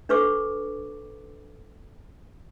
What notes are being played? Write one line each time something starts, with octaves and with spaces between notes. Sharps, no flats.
D4 A4 B4 C#6 D6